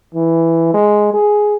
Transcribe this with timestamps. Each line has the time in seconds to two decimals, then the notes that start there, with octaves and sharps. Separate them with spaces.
0.14 E3
0.74 G#3
1.14 G#4